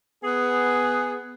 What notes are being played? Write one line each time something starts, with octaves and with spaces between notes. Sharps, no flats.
B3 G#4